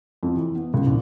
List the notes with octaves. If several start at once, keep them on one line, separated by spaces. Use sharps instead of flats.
F2
E3
B3
C#2
A#1